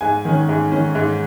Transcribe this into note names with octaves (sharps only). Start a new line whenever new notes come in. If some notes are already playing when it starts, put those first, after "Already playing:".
G#2 G#5
D#3 C#4
G#2
D#3 C#4
G#2